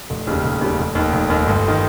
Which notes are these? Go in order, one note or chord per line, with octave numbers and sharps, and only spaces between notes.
F1
D#2 C#3 G3
F1
D#2 C#3 G3
F1
D#2 D#3
F1
D#2 D#3
G1
D#3